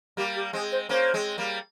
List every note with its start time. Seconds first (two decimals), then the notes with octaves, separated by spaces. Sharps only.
0.17 G3 A#3 G4
0.35 G4
0.53 G#3 C4 G#4
0.72 C5
0.89 A#3 C#4 C5
1.14 G#3 C4
1.38 G3 A#3